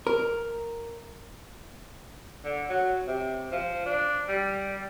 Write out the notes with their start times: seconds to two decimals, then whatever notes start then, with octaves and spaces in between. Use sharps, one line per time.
0.07 A#4
2.45 D3
2.69 F#3
3.08 C3
3.52 F3
3.86 D4
4.29 G3